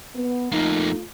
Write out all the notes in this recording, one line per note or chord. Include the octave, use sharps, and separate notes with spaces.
B3
F2 A3 A#3 D#4 F4